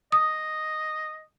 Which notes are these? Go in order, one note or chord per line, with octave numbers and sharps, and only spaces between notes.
D#5 D#6